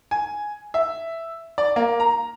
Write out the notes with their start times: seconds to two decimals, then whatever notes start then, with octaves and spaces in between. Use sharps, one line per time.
0.11 G#5
0.74 E5
1.58 D5
1.76 A#3
2.00 A#5